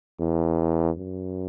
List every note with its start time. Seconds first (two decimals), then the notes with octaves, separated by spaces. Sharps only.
0.20 E2
0.98 F#2